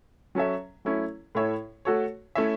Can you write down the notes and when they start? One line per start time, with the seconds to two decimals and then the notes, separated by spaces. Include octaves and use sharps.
0.35 F#3 C#4 A4 E5
0.85 F#3 A3 C#4 E4 C#5
1.35 A2 A3 E4 C#5 E5
1.85 A3 F#4 A4 C#5
2.35 A3 C#4 E4 C#5 E5